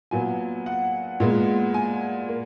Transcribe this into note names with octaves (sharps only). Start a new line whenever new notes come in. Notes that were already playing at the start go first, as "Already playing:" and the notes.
A#2 F#3 B3 G#5
F#5
A#2 G#3 B3
G#5
A#3